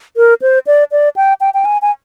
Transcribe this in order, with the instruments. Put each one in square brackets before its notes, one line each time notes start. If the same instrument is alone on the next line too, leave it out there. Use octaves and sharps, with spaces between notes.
[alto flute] A#4
C5
D5
D5
G5
G5
G5
G#5
G#5